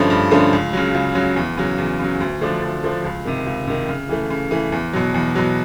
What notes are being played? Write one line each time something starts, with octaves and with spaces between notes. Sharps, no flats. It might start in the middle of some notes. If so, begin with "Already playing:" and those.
Already playing: G2 D3 F3 A3 C#4
G2
D3 F3 A3 C#4
C#2
C#3 F#3
C#2
C#3 F#3
E2
C#3 F#3
E2
C#3 F#3
D2
D3 F3 A3 D4
D2
D3 F3 A3 D4
C#2
C3 D#3
C#2
C3 D#3
C#3
E3 A3
C#3
E3 A3
E2
B2 F#3
E2
B2 F#3